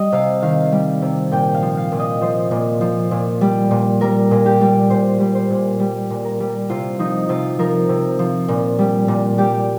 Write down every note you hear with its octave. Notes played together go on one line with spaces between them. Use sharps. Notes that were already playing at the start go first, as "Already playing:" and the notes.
Already playing: G3 D#5
C3 F5
D#3 F5
G3
C3
A#2 G5
F5
F3
F5
A#2
D#5
F3 C5
A#2
F3
A#2
G3
A#2
G3 A#4
A#2
G4
G3
A#2 C5
G3
C5
A#2
G3
A#2
A#4
G3
C3 F4
F3 D#4
C3 F4
F3 A#4
C3
F3
A#2
G3
A#2
G3 G4